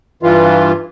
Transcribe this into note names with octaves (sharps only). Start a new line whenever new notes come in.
G2 E3 F4